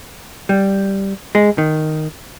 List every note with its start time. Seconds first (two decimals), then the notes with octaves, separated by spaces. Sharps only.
0.49 G3
1.35 G#3
1.58 D#3